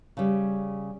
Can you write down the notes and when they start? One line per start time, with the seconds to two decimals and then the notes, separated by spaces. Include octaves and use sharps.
0.17 C#3 G3